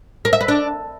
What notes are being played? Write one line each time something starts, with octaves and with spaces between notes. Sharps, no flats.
A#4
E5
B4
D4